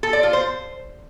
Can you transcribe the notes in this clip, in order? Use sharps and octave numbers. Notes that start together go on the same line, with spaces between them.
A4
D5
F4
C5